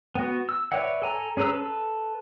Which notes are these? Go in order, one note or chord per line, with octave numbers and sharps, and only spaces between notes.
B3 F#4
E6
B4 C#5 D5 E5 F#5
A4 G#5 A#5
C#4 G#4 B4 A#5 E6
A4 B4